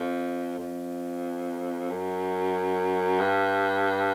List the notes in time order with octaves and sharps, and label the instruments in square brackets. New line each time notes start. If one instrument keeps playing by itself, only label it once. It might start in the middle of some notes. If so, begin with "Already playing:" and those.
Already playing: [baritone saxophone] F2
F2
F#2
G2